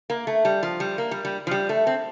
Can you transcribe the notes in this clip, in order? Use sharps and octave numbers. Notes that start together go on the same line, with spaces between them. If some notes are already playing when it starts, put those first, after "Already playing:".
A#3
A3
G3
F3
G3
A#3
G3
G3
F3
G3
A3
C4